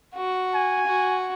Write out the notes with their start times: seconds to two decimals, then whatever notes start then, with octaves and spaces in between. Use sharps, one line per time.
0.15 F#4
0.54 G#5
0.86 F#4